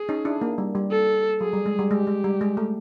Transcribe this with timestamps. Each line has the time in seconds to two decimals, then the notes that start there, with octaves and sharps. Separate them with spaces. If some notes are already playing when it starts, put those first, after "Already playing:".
Already playing: G#4
0.09 C#4 D#4
0.25 D4 E4
0.41 A#3
0.58 G3
0.75 G3
0.91 A4
1.41 F#3 G#4
1.54 G3
1.66 G#3
1.79 G3
1.90 G#3 G4
2.07 G#3
2.24 G3
2.41 G#3
2.57 A3